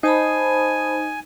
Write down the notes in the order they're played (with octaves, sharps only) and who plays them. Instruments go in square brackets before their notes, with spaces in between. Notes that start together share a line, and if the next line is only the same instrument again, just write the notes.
[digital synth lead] D#4 [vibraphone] C5 A5 B5 [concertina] G#5